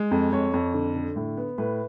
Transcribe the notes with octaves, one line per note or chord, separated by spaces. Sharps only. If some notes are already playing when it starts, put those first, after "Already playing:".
Already playing: G#3
F2
F2 C#5
F2
D3
D3
A2
B3
A2 B4